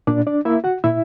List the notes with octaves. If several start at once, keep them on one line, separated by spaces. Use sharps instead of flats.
A#2 D4 D5
D4 D5
A#3 E4 E5
F#4 F#5
A#2 E4 E5